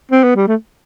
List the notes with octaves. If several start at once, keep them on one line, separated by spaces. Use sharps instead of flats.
C4
B3
G3
A3